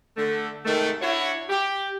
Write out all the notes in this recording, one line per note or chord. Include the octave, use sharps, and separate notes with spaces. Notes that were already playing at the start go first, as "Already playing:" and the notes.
D3 A3
G#2 C3 D#3 A3
D4 E4 F#4 C#5
G4